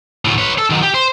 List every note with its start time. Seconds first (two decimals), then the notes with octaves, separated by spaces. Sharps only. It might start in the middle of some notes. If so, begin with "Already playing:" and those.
0.25 D2 A2
0.38 B4 C#5
0.58 A4
0.70 D#3 F#3
0.83 G4
0.94 C5